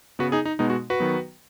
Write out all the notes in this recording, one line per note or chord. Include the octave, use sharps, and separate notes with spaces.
C#3 B3 F#4 B4
D#4 G#4
D#4
B2 G#3 B3 D#4
F#4
F#4 B4
D#3 F#3 B3